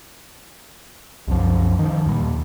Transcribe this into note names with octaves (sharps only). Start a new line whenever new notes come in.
C2 F#2 F3
D#3 F3
D#2 A#2 G3